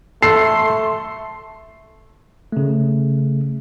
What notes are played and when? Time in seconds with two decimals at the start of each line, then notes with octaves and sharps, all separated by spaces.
0.22 A3 A4 C6 C7
2.52 C#3 A3